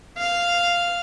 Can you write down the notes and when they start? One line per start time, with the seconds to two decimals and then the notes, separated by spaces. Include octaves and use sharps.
0.18 F5